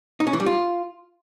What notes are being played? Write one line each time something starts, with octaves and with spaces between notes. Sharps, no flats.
D#4
C#4
E3
G3
F4